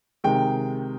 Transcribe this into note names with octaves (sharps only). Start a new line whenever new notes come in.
C3 D#3 G#3 G5